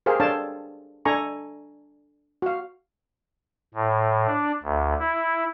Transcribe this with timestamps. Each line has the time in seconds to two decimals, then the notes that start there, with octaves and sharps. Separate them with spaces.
0.06 G4 G#4 A#4 C5 F5
0.20 D4 A4 C#5 F5 G5 A5
1.05 D4 A4 G#5 A#5 C#6
2.42 F#4 F5
3.74 A2
4.27 D4
4.63 D2
4.99 E4